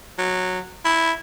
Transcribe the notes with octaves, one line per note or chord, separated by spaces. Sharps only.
F#3
E4